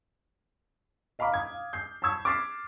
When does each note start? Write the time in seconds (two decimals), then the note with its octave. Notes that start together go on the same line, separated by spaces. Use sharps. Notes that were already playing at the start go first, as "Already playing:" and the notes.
1.19 D#5 F5 A#5 B5 D6 F6
1.33 D#6 G#6
1.50 F5
1.73 G6 C7
2.02 A5 B5 C#6 E6 G#6
2.25 D6 F6 A6 B6 C7 D7